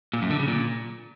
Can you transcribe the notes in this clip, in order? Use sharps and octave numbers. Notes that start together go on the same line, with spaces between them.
A#2
F#2
D3
C#3
A#2